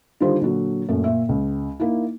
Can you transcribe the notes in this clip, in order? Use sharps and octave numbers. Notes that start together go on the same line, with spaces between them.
D3 D#3 G3 F4 G4 C5
A#2 D3 F#3
F#2 A#2 A3
A#2 E5
C#2
A#3 D#4 E4